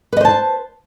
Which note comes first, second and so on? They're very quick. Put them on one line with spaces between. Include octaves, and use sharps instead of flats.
B4 D#5 C5 A5